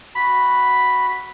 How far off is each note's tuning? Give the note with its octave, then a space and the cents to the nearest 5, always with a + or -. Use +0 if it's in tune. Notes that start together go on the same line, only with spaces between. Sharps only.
F#4 +0 B5 +0